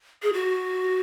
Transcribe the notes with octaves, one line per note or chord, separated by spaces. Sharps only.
G#4
F#4